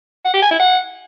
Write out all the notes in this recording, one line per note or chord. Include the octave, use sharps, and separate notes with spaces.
F#5
G4
G#5
E4
F#5